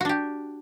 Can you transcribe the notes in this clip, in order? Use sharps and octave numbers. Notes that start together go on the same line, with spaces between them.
D4 F#4 G4